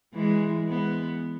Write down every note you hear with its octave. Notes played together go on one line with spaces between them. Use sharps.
E3 G#3
G#3 B3